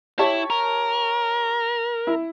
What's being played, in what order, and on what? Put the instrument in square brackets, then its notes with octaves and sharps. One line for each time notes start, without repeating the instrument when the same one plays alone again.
[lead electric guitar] E4 [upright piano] G4 C#5 A5
[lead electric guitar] A#4
[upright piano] E4